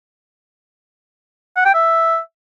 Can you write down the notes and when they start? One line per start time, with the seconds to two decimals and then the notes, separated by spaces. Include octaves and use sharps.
1.57 F#5
1.65 G5
1.74 E5